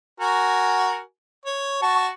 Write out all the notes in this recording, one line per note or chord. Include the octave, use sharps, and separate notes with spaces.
F#4 A#4 G#5
C#5
F#4 A5 C#6